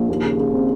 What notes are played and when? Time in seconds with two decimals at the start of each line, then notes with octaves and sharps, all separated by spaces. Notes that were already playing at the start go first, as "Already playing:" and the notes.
Already playing: A#1
0.09 D#2
0.24 C#3
0.39 C#3
0.54 C4